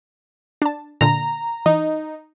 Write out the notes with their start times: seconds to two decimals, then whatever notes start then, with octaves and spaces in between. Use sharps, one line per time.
0.62 D4 A5
1.01 A#2 D3 A#5
1.66 E3 D#4